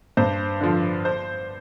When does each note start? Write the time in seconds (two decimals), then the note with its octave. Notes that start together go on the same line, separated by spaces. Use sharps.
0.17 G2 C5
0.61 D3 F3
1.05 C5